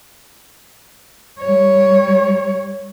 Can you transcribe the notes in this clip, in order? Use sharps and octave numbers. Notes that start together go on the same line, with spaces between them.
G3 C#5